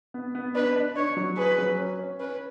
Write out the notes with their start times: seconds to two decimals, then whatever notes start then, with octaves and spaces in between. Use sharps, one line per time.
0.14 B3
0.35 B3
0.55 D4 B4
0.76 D4
0.95 D4 C#5
1.17 F#3
1.37 G#4 B4
1.58 F#3
1.78 C#4
1.99 C#4
2.20 C#4 B4